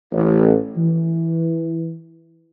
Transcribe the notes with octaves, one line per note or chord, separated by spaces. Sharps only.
A1
E3